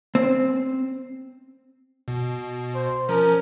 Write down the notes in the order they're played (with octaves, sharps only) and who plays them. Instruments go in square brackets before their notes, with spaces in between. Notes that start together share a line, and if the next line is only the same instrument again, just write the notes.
[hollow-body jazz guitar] C4
[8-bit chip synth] B2
[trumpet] C5
[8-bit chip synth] F3 C#4 [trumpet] A#4